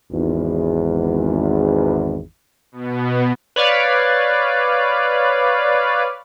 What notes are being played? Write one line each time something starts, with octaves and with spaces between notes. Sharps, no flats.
G#1 E2
B2 B3
B4 C#5 D5 F5